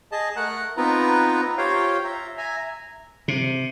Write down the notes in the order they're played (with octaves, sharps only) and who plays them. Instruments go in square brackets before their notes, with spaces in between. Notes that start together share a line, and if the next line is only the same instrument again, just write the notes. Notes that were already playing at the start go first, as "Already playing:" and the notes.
[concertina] G#4 D#5 A5
A3 A#4 F#5 A#5 F#6
B3 C4 D#4 F4 B4 A#5
F4 G4 C5 C#5 F5 G5
E5 A#5
E5 G#5 A#5
[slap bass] C3